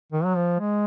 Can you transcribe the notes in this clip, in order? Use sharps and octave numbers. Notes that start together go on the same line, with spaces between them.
D#3
F#3
F3
G#3